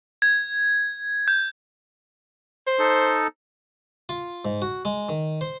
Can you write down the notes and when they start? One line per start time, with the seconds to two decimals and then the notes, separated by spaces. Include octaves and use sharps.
0.22 G#6
1.28 G6
2.67 C5
2.79 D#4 A4
4.09 F4
4.45 G#2
4.62 F#4
4.85 G#3
5.09 D#3
5.41 C5